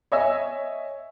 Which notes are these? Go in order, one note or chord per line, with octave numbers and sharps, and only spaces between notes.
C#5 D#5 E5 G#5 E6